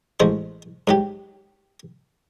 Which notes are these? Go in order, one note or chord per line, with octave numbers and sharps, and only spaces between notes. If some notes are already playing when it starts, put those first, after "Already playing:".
A1 G#3 C5 C#6
G#2 F#3 G4